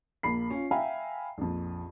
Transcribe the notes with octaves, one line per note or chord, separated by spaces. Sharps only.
A#1 A#3 B5 C7
C#4 F4
E5 F5 G5 G#5 A#5 B5
A#1 F2